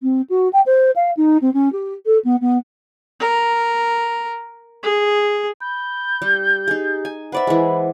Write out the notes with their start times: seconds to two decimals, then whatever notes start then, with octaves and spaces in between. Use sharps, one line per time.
0.02 C4
0.29 F#4
0.53 G5
0.66 C5
0.95 F5
1.17 D#4
1.41 C4
1.54 C#4
1.72 G4
2.06 A4
2.24 B3
2.41 B3
3.20 A#4
4.83 G#4
5.60 B5 G6
6.22 G3 G4
6.68 D#4 G#4
7.05 G#5
7.32 B4 C5 D5 E5 F#5 B5
7.47 E3 G#3